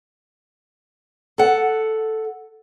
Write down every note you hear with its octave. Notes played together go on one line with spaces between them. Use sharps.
A4 F#5